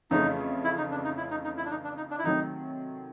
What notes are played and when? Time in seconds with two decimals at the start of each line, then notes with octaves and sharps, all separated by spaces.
0.11 F2 C#3 E3 A3 C#4 D#4
0.64 E4
0.78 D#4
0.91 D4
1.04 D#4
1.17 E4
1.31 D#4
1.44 D#4
1.57 E4
1.65 D4
1.70 D#4
1.84 D4
1.97 D#4
2.11 D4
2.19 E4
2.24 C3 D#3 F#3 A3 D#4